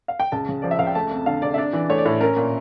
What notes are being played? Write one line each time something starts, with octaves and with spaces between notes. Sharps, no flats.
F5
G5
C#2 A5
C#3
F3 D5
E5
C#2 F5
G5
A3 A5
F2
D3 F5
F1 D5
E5
D4 D5
E3
A3 C#5
D5
A2 C#5
C#4 A#4
A#2